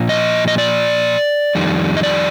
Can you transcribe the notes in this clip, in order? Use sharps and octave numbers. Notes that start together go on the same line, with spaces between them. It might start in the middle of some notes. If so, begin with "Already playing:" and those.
Already playing: A#2 F3
D#5
D#5
D5
F2 D#3 G3
D#5
D5